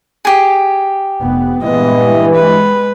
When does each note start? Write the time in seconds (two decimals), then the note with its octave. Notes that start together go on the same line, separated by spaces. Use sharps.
0.25 G4 G#4
1.20 F1 B3
1.63 G2 A#2 E3 G#3 B3 D#5
2.34 G#3 B4